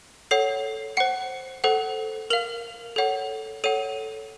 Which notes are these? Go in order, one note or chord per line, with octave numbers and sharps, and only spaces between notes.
A4 C#5 F#5 C7
C5 F#5 C#7
A4 C5 F#5
A#4 F5 F7
A4 C#5 F#5
A4 C#5 F#5 D#7